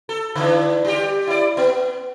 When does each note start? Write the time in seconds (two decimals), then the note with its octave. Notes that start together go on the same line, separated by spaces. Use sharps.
0.09 A4
0.36 D3 E3 D4
0.84 G3 G4
1.27 E4 D5
1.57 B3